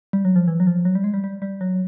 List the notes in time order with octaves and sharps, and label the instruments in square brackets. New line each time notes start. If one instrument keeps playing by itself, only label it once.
[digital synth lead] G3
F#3
F3
E3
F#3
F3
F#3
G3
G#3
G3
G3
G3
F#3